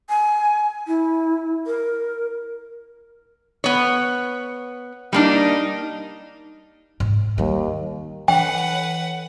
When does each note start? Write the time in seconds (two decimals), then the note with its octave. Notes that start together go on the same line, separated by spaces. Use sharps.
0.09 G#5
0.87 E4
1.67 A#4
3.64 B3 C#5
5.13 G3 A#3 D4 D#4
7.00 G#2
7.38 D#2 G3 A#3
8.28 E3 B4 C#5 F#5 G5